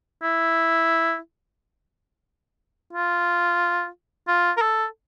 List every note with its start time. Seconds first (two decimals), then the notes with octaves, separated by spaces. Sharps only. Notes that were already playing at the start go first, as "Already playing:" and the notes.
0.23 E4
2.93 F4
4.28 F4
4.57 A#4
4.62 A4